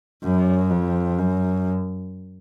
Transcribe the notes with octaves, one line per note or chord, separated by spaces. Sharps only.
F#2
F2
F#2